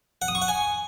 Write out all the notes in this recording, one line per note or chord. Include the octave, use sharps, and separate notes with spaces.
F#5
D#6
C#6
F#5
G#5